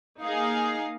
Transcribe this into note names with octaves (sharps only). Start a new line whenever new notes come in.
A#3 D#4 G#4 F5